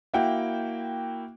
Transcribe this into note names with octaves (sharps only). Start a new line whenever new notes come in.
A#3 E4 F#4 F#5 G5